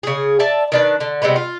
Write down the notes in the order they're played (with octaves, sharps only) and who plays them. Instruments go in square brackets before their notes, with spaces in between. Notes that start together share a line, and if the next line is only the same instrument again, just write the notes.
[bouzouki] C#3 G#4
D5 E5 A5
D#3 D4 B4
D3
C3 G3 G#3 B3
F4